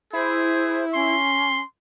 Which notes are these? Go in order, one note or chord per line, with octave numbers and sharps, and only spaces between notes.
E4 G#4 C5
C#4 C6